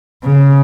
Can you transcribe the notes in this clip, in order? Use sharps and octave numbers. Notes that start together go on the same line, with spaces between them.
C#3